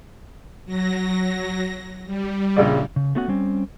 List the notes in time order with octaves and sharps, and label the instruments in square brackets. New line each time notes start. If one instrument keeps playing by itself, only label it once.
[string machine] F#3 A#6
G3
[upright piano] A#1 C#3 D5
[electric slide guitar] C#3
A3 B3 C#4 F#4 F#5
G3 C4 C#4